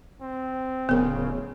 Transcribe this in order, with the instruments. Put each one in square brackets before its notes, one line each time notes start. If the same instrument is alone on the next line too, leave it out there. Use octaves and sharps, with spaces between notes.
[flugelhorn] C4
[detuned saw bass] D1 [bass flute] C#3 [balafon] B3 A#4